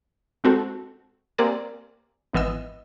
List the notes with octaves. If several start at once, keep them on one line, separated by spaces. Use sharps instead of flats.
G#3 C4 F#4 A4
A#3 C4 G4 A#4 D5 G#5
G#1 E3 B3 D#5 E6